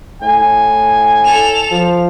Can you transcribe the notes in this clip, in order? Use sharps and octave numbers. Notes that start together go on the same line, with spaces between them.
A2 G#5
A4 F7
F3